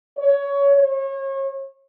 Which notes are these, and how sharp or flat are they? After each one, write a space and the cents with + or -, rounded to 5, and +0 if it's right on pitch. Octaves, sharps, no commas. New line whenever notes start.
C#5 +20
C#5 -35